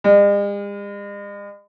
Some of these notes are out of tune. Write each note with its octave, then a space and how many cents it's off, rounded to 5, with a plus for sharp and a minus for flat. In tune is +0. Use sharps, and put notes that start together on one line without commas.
G#3 -45